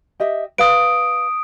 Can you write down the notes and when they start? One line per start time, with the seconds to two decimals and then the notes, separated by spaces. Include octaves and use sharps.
0.20 G4 D#5 E5
0.58 B4 F5 D#6 D7